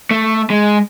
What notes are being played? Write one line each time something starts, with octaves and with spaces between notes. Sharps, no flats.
A3
G#3